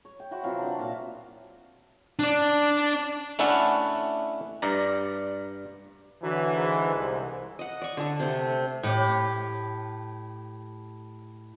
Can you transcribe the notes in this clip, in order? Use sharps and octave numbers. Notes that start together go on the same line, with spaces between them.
C#5
G5
E4 F#4 C5 F#5
C3 E3 F#3 F4
D4 F#5 G5 A5
A#2 F#4 E5 F5
D4 D5
A3 C#4 D4 E4 A4 F#5
G2 D5 A#5
D3 E3 F#3
G#2
C2
D#5 F#5
D5 C#6
D3 A4
C3 A3
A2 G4